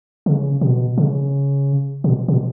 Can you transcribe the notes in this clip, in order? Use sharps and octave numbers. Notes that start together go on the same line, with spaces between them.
C#3
B2
C#3
B2
B2